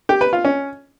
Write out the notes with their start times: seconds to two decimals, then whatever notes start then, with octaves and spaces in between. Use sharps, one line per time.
0.09 G4
0.21 B4
0.33 F4
0.45 C#4